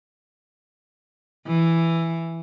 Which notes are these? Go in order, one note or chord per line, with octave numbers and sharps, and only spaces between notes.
E3